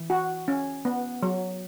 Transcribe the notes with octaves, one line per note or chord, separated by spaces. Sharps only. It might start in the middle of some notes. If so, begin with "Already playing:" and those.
Already playing: E3
F#4
C#4
B3
F#3